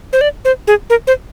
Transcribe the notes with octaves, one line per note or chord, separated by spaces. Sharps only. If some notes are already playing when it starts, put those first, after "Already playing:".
C5
D5
C5
G#4
A#4
C5